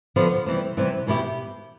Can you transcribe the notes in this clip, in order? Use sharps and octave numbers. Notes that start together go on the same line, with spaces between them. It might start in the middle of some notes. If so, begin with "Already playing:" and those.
D3 F3 B3
C3 E3 G3
C3 E3 G3
E2 B2 B3 E4 G4